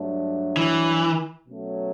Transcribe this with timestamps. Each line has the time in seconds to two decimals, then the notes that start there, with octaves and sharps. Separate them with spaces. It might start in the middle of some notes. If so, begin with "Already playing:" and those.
Already playing: G2 F#3 A3 D4
0.57 E3
1.46 B2 F#3 A3 C#4